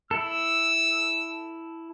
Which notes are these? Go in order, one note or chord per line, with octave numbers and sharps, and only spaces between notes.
E4 A4 E6